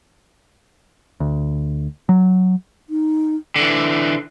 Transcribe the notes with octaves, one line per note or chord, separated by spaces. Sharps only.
D2
F#3
D#4
D3 E3